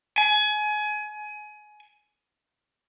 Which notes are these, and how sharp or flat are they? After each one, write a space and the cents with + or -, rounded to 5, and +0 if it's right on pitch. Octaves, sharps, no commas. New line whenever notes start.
G#5 +25